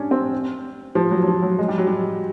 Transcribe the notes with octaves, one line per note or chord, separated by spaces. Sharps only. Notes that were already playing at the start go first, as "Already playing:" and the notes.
Already playing: C#4 D4
C4
F3
F#3
F#3
F3
F#3
G#3
G3
F#3
G3